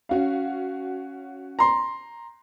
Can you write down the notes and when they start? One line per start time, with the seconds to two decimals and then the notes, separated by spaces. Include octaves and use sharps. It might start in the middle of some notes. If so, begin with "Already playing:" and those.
0.09 C#4 F#4 F5
1.59 A#5 C6